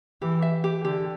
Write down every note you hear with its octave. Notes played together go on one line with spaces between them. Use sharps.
E3 G4
E5
G4
D3 G4